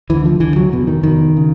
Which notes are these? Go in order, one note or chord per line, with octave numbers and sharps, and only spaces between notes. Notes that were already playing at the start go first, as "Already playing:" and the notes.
D2 D3 E3
F3
D2 D3 E3
F#3
F1 E2 B2
D#3
F1 E2 B2 D#3
C#3